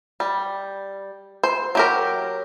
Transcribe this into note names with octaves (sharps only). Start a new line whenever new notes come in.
G3
C5
F#3 G4 A#4